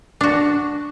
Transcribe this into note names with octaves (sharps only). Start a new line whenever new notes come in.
D4 F#4